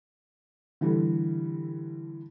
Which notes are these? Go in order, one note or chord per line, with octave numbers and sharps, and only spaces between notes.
D3 E3 G3 A3